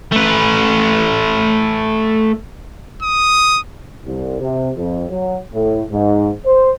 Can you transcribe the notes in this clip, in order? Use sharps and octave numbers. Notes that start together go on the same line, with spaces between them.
A3 B4
D#6
C2
C3
F2
F#3
A2
G#2
C5